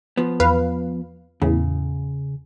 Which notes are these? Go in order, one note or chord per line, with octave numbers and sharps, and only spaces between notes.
F3 B3
E2 B4 F5
E2 A2 C#3